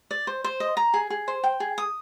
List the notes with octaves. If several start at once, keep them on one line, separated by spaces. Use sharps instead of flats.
D5
C5
C5
D#5
A#5
G#4
G#4
C5
G5
G#4
D#6